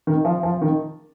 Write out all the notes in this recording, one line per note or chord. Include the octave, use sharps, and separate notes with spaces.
D#3
F3
F3
D#3